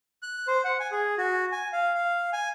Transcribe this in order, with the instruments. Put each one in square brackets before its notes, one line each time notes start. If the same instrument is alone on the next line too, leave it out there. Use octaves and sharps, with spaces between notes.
[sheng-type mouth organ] F#6
C5
F#5
G#5
G#4
F#4
G#5
F5
F5
G#5